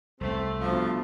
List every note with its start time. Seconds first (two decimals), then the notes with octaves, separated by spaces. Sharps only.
0.21 C2 A3 C4
0.61 G2 B2 F3